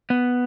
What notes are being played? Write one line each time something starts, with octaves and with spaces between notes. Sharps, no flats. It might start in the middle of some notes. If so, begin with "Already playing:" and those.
B3